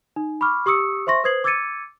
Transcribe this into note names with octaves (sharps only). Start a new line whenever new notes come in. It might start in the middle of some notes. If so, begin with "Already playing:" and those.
D#4
B5 C#6 D6 F6
G4 C#6 D#6 E6 C#7
C5 E5 C6 C#6 A#6
B4 C5 D#6 G#6 C7 F#7
D6 E6 G#6 A6 C#7 D#7